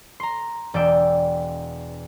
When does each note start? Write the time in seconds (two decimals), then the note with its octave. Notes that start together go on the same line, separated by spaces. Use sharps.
0.20 A#5 C6
0.74 E1 D5 G5 E6